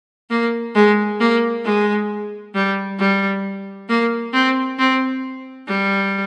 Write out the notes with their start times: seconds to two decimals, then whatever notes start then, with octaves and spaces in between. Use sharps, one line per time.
0.30 A#3
0.75 G#3
1.20 A#3
1.65 G#3
2.55 G3
2.99 G3
3.89 A#3
4.33 C4
4.79 C4
5.67 G3